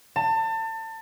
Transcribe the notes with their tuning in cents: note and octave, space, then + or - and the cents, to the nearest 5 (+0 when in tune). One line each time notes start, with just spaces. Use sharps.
A5 +30